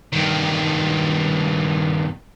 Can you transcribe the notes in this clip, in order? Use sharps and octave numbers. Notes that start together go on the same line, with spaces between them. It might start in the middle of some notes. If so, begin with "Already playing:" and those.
G2 D#3